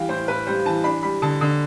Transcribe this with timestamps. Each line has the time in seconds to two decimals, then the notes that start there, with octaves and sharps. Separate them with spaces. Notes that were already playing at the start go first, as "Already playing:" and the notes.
Already playing: E3 G3 F5 G5
0.09 A2 C5
0.28 A2 B4
0.47 G3 C5
0.65 E3 A5
0.84 D4 B5
1.03 G3 B5
1.22 D3 A5
1.41 D3